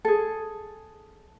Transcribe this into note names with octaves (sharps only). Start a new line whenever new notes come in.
G#4 A4